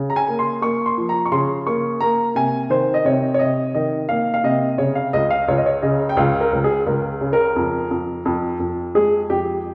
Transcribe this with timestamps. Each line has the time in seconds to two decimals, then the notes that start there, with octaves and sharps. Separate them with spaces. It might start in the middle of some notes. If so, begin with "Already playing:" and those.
Already playing: C#3
0.10 A#5
0.16 G#5
0.28 A#3
0.39 C6
0.62 A#3 C#6
0.86 C6
0.98 F3
1.09 A#5
1.26 C#6
1.32 C#3 C6
1.67 A#3 C#6
2.01 A#3 A#5
2.35 C3 G#5
2.70 D#3 C5
2.94 D#5
3.05 C3 C#5
3.34 C#5
3.39 C3 D#5
3.74 D#3 D#5
4.09 A#3 F5
4.34 F5
4.44 C3 D#5
4.78 C#3 C#5
4.95 F5
5.13 C#2 D#5
5.30 F5
5.48 C#2 C#5
5.57 D#5
5.66 C#5
5.82 C#3 D#5
6.09 G5
6.17 C#2 F5
6.41 A#4
6.53 C#2
6.64 G#4
6.86 C#2 A#4
7.21 C#3
7.33 A#4
7.56 F2
7.91 F2
8.25 F2
8.60 F2
8.95 G#3 G#4
9.30 F2 G4